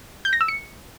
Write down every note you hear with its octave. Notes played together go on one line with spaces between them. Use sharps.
G6
A#6
E6
C#7